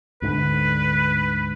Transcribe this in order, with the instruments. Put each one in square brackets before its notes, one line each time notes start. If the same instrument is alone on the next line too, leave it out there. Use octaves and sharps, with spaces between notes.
[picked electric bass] D2 G#2 D3 [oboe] B4